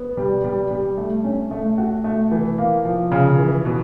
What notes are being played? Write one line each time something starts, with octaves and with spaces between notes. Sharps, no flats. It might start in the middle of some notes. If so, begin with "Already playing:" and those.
Already playing: B3
G3
G3
G3
A3
C#4
A3
F#4
A3
E3
A#3
F3
C#3
E3
B2